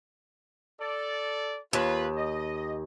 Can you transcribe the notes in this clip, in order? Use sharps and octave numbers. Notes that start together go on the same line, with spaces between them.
A4 D5
D#2 F4 B4
D#5